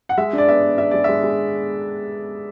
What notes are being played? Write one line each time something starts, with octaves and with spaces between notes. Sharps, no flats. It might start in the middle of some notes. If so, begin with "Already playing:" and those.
F#5
G#3 E5
D4
D5
B3 E5
B3
D4 E5
G#3 D5
G#3 E5
G#3